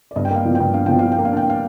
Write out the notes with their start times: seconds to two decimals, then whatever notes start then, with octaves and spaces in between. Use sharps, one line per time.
0.11 D5
0.16 G2 D#5
0.25 G5
0.30 A#3
0.36 F5
0.45 F3
0.55 G5
0.60 G2
0.74 D4 F5
0.86 F3 G5
0.99 F3 F5
1.12 G5
1.18 A#3
1.25 F5
1.33 D4 G5
1.50 F5